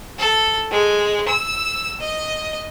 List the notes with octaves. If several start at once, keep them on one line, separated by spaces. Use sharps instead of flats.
A4
G#3
E6
D#5